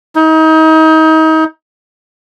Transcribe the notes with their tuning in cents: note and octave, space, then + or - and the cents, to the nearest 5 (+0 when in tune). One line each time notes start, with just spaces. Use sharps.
D#4 +30